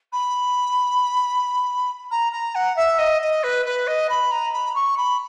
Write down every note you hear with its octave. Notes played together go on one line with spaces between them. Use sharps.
B5
A#5
A#5
F#5
E5
D#5
D#5
B4
B4
D#5
B5
A#5
B5
C#6
B5